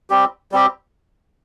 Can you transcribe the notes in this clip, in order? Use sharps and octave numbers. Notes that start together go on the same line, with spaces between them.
G3 C4 G4
G3 C4 G4